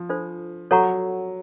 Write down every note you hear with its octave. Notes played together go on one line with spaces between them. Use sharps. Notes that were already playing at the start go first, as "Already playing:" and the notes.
Already playing: F3
D4 F4 A4 C5
F#3 A4 C#5 F#5 A#5 C#6